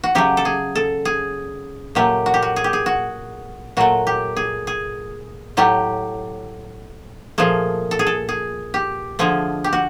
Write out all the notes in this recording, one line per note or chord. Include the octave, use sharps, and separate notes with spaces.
F#4
C#3 F#3 A3 G4
A4
G#4
A4
G#4
A#2 F#3 A3 G4
F#4
G4
F#4
G#4
G4
G#4
F#4
A#2 F#3 A3 F#4
G4
G#4
G#4
A2 F#3 A3 G4
A#2 F3 A3 G#4
A4
G#4
A4
G#4
G4
D3 F3 A3 G#4
G4
F#4